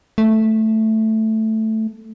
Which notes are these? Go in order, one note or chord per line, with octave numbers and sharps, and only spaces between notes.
A3